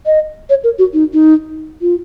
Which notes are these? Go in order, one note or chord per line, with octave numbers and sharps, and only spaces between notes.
D#5
C#5
A#4
F#4
D#4
D#4
F4